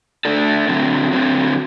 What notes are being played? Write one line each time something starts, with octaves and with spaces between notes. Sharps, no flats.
A3 D4 A4 D5
D3 F#3 C4
D3 F#3 C4